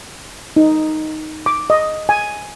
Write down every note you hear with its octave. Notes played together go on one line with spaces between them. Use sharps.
D#4
D6
D#5
G#5